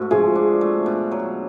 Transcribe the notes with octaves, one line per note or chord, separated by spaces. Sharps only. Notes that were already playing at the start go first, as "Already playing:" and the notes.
Already playing: G#2 A3 F#4
F3 G#4
D4
A3
B2
F#3